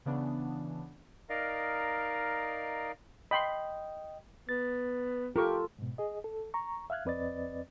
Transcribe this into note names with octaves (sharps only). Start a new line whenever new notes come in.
C#3 E3 B3 D4
D#4 A#4 D5 D#5 F5
D#5 G5 B5 C6
B3 A6
F4 G4 A4 A#4 C#6
G#2 B2
G#4 D#5
A4
A#5 C#6
E5 F5 F6 F#6 G#6
F2 C4 B4 D5 D#5 A6